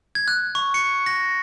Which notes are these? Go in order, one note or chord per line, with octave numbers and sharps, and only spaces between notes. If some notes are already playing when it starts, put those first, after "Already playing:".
G#6
F#6
C#6
C#7
A#6